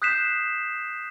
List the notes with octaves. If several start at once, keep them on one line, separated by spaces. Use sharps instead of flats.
D#6 F#6 G6 B6 C7 E7